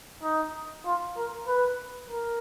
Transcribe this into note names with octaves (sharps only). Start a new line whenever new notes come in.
D#4
F4
A#4
B4
A#4